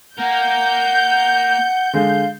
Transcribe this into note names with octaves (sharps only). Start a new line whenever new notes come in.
A#3 A#4 F#5 G6
D3 G#3 F5